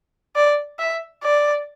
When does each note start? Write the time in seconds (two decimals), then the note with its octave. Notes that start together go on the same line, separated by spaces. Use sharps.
0.36 D5
0.79 E5
1.24 D5